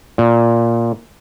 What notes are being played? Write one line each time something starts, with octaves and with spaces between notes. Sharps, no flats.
A#2